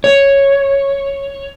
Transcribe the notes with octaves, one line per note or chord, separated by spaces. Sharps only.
C#5